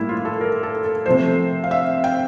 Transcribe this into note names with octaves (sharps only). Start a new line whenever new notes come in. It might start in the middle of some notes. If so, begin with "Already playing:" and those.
Already playing: A2 G3 A#3 E4
F4
A4
A#4
A4
A4
C3 F3 A3 C5
F5
E5
G5